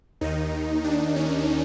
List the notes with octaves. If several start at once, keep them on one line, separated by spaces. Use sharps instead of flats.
D#2 D#3 D#4
D4
C#4